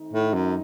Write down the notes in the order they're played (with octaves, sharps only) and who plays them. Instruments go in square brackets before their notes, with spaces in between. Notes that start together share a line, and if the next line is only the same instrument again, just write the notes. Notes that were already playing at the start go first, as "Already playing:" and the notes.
Already playing: [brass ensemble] D#3 A3 C4 D#4
[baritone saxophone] A2
F#2